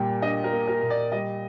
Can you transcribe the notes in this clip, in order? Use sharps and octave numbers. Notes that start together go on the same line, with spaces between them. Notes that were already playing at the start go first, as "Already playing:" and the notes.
Already playing: A#2 G3 A#3 G5
D4 D#5
A#4
A#3
A#4
A#2
D5
G3 D#5